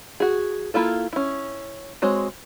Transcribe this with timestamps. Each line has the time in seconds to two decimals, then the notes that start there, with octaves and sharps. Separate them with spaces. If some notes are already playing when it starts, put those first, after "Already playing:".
0.20 F#4 G#4
0.74 A#3 E4 F4 A4
1.13 C#4 E4
2.02 G#3 C4 F#4 C#5